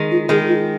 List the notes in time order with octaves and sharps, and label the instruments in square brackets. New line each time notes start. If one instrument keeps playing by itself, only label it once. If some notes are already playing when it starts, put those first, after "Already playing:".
Already playing: [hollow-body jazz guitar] D#3 G#3
[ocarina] F4
[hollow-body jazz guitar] D#3 G#3 [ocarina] G#4
[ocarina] F4